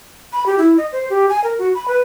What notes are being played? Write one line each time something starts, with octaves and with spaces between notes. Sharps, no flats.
B5
G4
E4
D#5
C5
G4
G#5
A#4
F#4
B5
B4